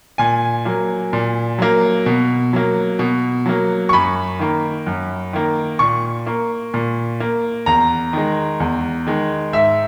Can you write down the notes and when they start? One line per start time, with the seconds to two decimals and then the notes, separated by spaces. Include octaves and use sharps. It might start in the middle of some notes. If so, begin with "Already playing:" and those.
0.18 A#2 G#5
0.65 F#3 A#3
1.13 A#2
1.58 F#3 A#3
2.06 B2
2.53 F#3 A#3
2.99 B2
3.46 F#3 A#3
3.89 C#6
3.93 F#2 B5
4.39 D#3 A#3
4.86 F#2
5.33 D#3 A#3
5.79 A#2 C#6
6.26 A#3
6.74 A#2
7.20 A#3
7.66 E2 A#5
8.13 D#3 G#3
8.60 E2
9.07 D#3 G#3
9.53 G#2 E5